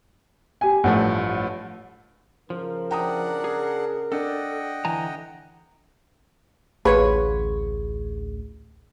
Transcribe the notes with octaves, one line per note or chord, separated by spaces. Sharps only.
G4 G#5
A1 G2 F3 A3 F#5
C#3 F3 A#4
D4 F#5 G5 A#5 D#6
G#4
D4 A4 D#5 F#5 G5
D3 E3 G#5 A#5
A1 D2 F4 F#4 G#4 B4 C#5